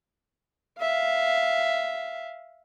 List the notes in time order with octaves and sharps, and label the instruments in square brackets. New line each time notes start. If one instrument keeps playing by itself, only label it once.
[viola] E5 F5